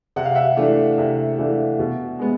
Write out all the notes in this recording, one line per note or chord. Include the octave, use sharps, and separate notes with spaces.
C3 F#5
F5
E5 F#5
E3 A3 D4
C3
E3 A3 D4
B2
G#3 B3